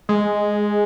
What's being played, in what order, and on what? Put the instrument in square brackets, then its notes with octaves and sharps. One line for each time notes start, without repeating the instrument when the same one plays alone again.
[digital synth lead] G#3